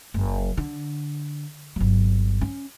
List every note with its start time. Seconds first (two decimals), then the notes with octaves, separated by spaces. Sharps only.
0.14 F#1
0.57 D3
1.76 G1 F#3
2.41 C#4